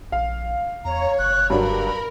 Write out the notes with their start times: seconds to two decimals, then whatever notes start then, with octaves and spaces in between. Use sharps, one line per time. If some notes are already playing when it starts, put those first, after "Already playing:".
0.12 A#1 F5
0.85 E2 C#5 A#5
1.19 F#1 F#6
1.50 G2 F#3 D4 A#4 B5